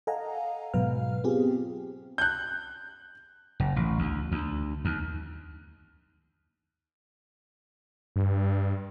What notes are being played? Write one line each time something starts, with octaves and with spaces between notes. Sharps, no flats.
A4 D#5 F5 F#5 G#5 A#5
G#2 B2 F#3 B4 F5 F6
B3 C4 F4 G4 G#4
F#6 G6
F#1
A1
D2
D2
D#2
G2